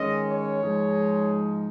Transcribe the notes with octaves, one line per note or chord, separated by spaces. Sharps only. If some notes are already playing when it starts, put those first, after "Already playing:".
Already playing: D#3 G#3 C#4 D#5
C#5
G#2 F3 G#3 D#4